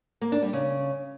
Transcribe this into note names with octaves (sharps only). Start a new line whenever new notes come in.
A#3
D4
G3
C#3